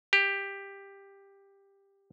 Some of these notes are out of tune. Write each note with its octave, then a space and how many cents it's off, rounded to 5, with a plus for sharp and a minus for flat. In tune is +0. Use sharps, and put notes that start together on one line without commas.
G4 +10